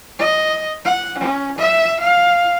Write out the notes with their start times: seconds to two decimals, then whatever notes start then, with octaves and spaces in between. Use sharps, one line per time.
0.19 D#5
0.85 F#5
1.18 C#4
1.58 E5
2.00 F5